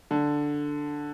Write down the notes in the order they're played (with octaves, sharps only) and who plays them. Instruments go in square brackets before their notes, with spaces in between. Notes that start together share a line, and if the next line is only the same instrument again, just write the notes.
[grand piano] D3